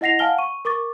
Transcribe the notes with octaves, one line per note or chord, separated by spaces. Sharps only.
E4 D#5 F#5 A#6 C7 F7
F5 F#5 G#5 A5 F6 G7
C#6 D#7
A#4 C#6 D6 A6